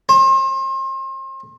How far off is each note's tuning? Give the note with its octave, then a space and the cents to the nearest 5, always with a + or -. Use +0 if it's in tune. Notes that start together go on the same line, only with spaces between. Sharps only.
C5 +35